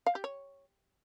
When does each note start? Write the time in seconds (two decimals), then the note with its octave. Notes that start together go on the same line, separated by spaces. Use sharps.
0.07 F5
0.15 G4
0.24 C#5